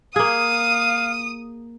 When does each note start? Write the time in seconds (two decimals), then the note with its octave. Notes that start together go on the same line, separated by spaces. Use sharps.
0.16 A#3 G#4 F5 D#6